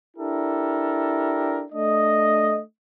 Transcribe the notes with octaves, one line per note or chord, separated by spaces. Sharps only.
D4 E4 G4 A4 A#4
A3 D4 D#5